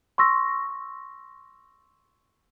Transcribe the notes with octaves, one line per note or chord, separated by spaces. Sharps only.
C6 C#6 E6 A#6